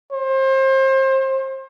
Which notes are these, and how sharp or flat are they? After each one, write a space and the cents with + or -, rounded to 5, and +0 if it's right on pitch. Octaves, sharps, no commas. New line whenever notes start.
C5 +30